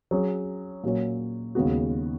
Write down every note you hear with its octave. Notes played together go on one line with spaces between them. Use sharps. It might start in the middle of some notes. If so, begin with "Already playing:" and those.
F#3 C#4 G#4 C#5
A#2 F#3 C#4 F#4 C#5
D#2 C#3 G#3 B3 F#4